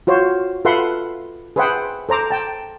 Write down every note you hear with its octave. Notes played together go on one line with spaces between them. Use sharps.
F4 F#4 C5 C#5
F4 A4 B4 E5 F#5 C6
G#4 B4 C5 E5 F#5 G5
A4 C5 A#5 D6
G5 A5